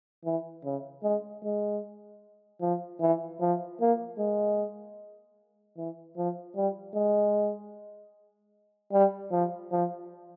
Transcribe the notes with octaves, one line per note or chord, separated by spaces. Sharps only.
E3
C#3
G#3
G#3
F3
E3
F3
A#3
G#3
E3
F3
G3
G#3
G3
F3
F3